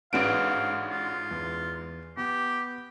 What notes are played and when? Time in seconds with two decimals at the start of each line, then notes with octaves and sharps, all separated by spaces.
0.13 A1 G#2 D4 F#4 B4 F5 D7
0.90 F4
1.31 E2
2.17 B3 G4